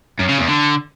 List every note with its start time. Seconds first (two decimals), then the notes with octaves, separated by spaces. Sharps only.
0.19 F#2
0.29 C#3
0.38 E2
0.48 D3